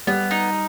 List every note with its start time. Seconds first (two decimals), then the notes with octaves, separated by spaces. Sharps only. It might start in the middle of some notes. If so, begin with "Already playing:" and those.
0.07 G3 B3
0.31 D#4